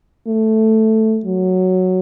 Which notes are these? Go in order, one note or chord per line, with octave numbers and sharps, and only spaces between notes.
A3
F#3